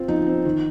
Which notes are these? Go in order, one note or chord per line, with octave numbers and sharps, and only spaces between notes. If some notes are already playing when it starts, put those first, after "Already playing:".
Already playing: C4 F4
F3 D#4
C4
D#3